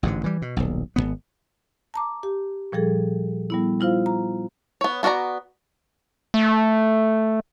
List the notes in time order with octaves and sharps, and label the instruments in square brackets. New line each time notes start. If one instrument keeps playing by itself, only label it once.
[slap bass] A1 G#2 B2 D3
E3 G3
B2
D#1 B1
G#1 G2 B3
[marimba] A5 A#5 D6
G4
A#2 F3 G3 G#4 A4
G3 B3 E4
G3 E4 F4 C5 F5
A#5
[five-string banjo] B3 C#5
B3 F#4 A#4 D5 A#5
[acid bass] A3